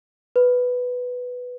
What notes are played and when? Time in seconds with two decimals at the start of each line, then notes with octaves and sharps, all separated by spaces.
0.36 B4